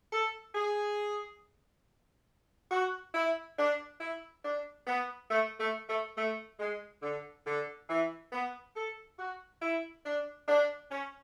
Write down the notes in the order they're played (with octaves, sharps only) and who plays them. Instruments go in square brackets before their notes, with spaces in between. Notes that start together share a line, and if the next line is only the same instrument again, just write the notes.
[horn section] A4
G#4
F#4
E4
D4
E4
D4
B3
A3
A3
A3
A3
G#3
D3
D3
E3
B3
A4
F#4
E4
D4
D4
C#4